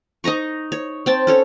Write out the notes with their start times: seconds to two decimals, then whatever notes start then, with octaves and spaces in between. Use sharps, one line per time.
0.24 D#4 D#5 A#5 C#6
0.72 C#5
1.06 C4 G5 A5
1.27 C#4 A4 C#5